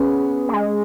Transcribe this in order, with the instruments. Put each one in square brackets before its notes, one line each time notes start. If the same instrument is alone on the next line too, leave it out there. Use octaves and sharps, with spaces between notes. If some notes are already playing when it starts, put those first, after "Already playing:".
Already playing: [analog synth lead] B3 [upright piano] C#4 G#4
[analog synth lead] A#3
G#3